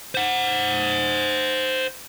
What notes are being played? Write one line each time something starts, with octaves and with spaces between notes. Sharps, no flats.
C5 F#5